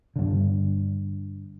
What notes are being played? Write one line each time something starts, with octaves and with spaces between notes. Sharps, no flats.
G2 D3